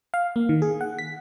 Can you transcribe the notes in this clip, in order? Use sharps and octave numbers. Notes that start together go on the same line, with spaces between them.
F5
A#3
D#3
G#4
F#5
B6